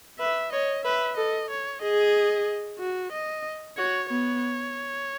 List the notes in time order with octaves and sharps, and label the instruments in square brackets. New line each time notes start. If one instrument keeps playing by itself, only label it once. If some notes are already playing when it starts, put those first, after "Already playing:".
[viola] B4 [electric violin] E5
[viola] C#5 [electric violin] D#5
[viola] B4 [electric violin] E5
[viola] A4 [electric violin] D#5
[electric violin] C#5
[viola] G#4 [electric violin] D#5
[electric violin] F#4
D#5
[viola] F#4 [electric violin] C#5
[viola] B3 [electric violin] C#5